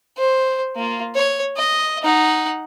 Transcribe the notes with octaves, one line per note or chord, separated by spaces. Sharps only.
C5
A#3 F4
C#5
D#5
D#4 F#5